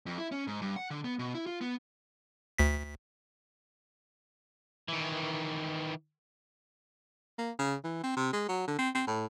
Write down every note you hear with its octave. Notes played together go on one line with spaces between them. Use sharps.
F2
E4
C#4
G#2
G2
F#5
D3
B3
B2
E4
F4
B3
D2 B6
D#3 E3
A#3
C#3
E3
C4
C3
G#3
F#3
D3
C4
C4
A2